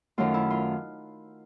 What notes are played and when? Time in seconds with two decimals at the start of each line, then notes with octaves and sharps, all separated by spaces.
0.18 F#2 D#3 F#3 A3 F4
0.34 E4
0.50 F4